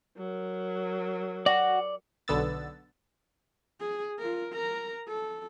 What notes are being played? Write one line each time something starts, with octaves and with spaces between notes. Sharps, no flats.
F#3 A#4
F#4 D5
B1 D3 B3 E6 A6
G#4
F4 A#4
A#4 A#5
A4